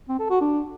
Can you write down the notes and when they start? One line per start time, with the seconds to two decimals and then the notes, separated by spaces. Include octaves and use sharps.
0.09 C4
0.19 A4
0.30 F#4
0.41 D4